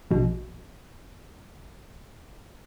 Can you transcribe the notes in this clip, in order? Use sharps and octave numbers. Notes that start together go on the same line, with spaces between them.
A#1 B2